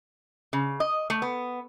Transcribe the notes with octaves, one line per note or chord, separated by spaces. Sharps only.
C#3
D#5
A3
B3